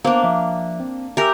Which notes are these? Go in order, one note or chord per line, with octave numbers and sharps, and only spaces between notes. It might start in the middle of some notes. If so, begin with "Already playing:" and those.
A#3 B3 D4 C5
F3 E5
C4
G4 A#4 E5 G#5 E6